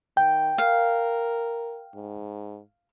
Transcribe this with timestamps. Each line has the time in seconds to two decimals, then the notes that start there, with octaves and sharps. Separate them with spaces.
0.17 D#3 G5
0.58 A#4 F5
1.95 G#2